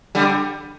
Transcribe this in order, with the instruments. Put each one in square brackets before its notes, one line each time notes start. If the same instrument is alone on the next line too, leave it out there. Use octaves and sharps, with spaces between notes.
[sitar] D3 G3